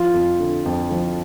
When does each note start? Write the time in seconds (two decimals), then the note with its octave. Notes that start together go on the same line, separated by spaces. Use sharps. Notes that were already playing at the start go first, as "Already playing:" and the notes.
Already playing: F3 F4
0.14 F2
0.40 D3
0.66 F2
0.91 F3